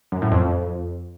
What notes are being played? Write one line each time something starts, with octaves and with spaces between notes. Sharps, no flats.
F#2
A2
F2